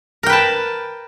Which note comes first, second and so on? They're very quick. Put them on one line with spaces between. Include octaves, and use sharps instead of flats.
A#4 G5 B4 A5